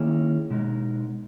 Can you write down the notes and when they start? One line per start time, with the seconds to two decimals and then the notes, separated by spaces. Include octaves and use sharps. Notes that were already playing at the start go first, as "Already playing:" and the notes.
Already playing: D#3 A#3 C#4 E4 G#4
0.50 B2 G#3 D#4